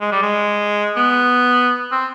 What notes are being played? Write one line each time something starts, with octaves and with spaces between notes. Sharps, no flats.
G#3
G3
G#3
B3
C4